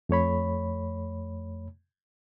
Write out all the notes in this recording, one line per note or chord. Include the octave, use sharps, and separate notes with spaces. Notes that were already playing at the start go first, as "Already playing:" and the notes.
F2 A3 C#5 B5